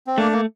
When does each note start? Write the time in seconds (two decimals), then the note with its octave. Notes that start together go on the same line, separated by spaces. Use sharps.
0.07 C4
0.17 A3 A#3 D4
0.32 A#3